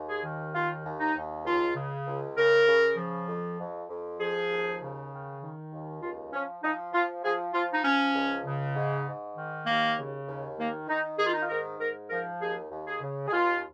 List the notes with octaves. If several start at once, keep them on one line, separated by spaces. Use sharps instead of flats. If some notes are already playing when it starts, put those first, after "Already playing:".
Already playing: D#2
G#4
D#3
D#2 F4
D#2
D#4
D#2
C#2 F4
C#3
C#2
C#3 A#4
C#3
F3
F2
F2
F2
F3 G#4
D#2
C#3
D#3
D#3
D#2
C#2 F4
F3 C#4
F3 D#4
F3 F4
F3 G#4
F3 F4
D#4
F3 C#4
C#2
C#3
G#2
G#2
D#3
D#2 A#3
C#3
D#2
D#3 A#3
D#3 D#4
D#3 G#4
F4
D#4
F4
G#2 A#4
G#2 A#4
F3 A#4
D#2 G#4
D#2
G#4
C#3
G#4
D#2 F4